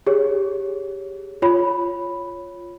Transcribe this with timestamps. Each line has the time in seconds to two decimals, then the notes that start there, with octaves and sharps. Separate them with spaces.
0.07 G4 G#4 C#5
1.42 F4 C#5 B5